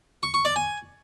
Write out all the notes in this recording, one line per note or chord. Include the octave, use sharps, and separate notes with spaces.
C#6
C#6
D5
G#5